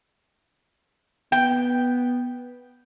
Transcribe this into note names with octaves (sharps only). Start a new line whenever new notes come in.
B3 G5